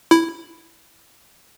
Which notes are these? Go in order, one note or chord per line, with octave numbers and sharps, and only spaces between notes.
E4